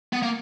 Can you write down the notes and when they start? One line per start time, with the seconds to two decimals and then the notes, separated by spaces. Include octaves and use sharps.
0.13 B3
0.22 A#3